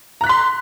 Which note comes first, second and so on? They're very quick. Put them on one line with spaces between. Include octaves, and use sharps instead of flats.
A#5 F#6 B6 C6